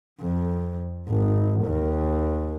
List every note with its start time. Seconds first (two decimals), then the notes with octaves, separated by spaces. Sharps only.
0.20 F2
1.08 G#1
1.65 D#2